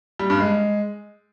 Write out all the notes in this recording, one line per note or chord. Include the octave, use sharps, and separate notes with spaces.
G3
G2
G#3